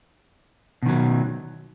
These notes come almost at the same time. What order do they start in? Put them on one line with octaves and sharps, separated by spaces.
B2 D#3 F#3